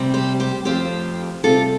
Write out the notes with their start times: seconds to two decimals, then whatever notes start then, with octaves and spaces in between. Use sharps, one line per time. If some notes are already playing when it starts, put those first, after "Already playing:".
Already playing: C3 G3 C4
0.14 G4 C5
0.40 G4 C5
0.65 F2 F3 A3 C4 G4 C5
1.43 C3 G3 C4 F4 A4